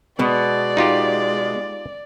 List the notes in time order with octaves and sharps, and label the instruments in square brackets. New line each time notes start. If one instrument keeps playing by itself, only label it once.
[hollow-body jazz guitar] B2 [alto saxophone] G#3 [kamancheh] D5
[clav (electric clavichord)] D#4 F4 G4